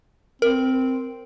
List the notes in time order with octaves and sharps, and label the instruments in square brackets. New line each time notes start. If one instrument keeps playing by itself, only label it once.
[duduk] C4 [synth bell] A#4